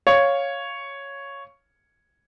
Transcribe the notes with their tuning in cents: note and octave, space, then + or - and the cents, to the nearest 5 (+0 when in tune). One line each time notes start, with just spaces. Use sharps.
C#5 +0 F5 +0